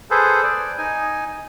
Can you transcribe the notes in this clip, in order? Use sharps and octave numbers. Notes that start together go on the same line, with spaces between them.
G#4 A4 B4 C5
D5
D#4 G#5